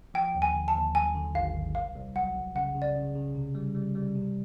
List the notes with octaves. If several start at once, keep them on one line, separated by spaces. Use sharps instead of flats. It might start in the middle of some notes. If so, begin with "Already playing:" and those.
F3 G5
D#2
G#5
D3
A5
D#2
F#3 G#5
D3
G#1 F5
G#1
C2 F5
C2
F#3 F#5
C2
C#3 F#5
C#3
D5
C#3
C#3
C3
G3
G3
G3
C3